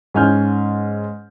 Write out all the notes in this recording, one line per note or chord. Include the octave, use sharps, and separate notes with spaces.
G#2 C#4 G#5 F6 G6